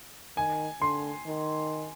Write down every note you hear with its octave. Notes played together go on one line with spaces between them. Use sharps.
D#3 G#5
D3 C6
D#3